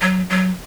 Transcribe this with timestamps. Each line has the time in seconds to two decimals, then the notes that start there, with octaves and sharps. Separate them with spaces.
0.01 F#3
0.30 F#3